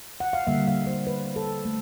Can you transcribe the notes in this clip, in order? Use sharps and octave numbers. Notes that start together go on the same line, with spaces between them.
F#5
F5
D3 G3 A#3 E5
F5
C5
B4
A4
A3